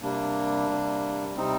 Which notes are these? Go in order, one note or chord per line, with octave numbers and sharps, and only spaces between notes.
C3 G3 A#3 D4
C3 G3
C3 G3 C4 D#4